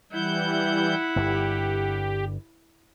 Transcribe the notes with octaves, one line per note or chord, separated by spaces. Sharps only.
E3 G3 E4 F#5 G6
G1 G2 G3 G4